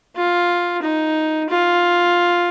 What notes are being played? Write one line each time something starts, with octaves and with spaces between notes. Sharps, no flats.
F4
D#4
F4